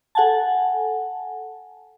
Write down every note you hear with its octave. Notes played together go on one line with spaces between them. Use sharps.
A4 F#5 G#5 A5